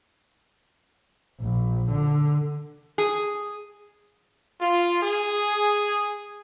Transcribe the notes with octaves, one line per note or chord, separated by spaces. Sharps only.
A#1
D3
G#4
F4
G#4